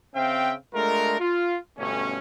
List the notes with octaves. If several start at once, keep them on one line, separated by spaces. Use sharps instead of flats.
C#3 C4 C5 E5 F5 G5
G#3 A3 D4 F4 A#4
F4
G1 B2 A3 C#4